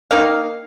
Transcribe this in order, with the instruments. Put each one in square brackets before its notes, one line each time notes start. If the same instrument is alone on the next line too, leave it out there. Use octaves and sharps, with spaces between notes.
[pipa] D#3 A#3 D#4 F5